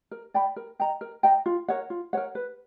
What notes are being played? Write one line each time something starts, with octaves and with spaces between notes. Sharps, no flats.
A#4
D5 G5 B5
A#4
D#5 G5 A#5
A#4
D#5 G5 A#5
F4
A#4 C#5 F#5
F4
A#4 C#5 F#5
B4